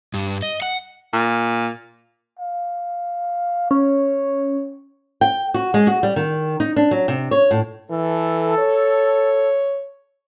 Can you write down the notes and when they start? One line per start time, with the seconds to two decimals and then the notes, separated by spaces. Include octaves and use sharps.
0.14 G2
0.42 D#5
0.62 F#5
1.14 A#2
2.39 F5
3.71 C#4 C#5
5.21 G5
5.54 F#4
5.74 G#3
5.87 F#4
6.03 G3
6.16 D#3
6.60 D#4
6.76 D4
6.91 F#3
7.08 C3
7.31 C#5
7.51 A2
7.91 E3 A4
8.59 C#5